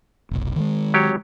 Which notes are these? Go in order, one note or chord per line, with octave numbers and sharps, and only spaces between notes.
F1 B1
D#3 F3 G#3
F#3 G4 C#5